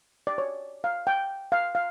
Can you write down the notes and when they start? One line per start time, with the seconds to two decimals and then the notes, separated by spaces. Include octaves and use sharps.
0.27 D5
0.38 C#5
0.84 F5
1.07 G5
1.52 F5
1.75 F5